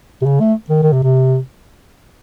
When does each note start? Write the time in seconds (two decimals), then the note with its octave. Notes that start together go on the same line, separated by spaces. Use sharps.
0.22 C3
0.26 C#3
0.41 A3
0.69 D#3
0.83 D#3
0.93 C3
1.03 C3